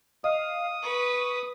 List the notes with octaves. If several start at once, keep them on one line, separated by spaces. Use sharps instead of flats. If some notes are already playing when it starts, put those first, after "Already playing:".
D#5 F5 D#6
B4 C#6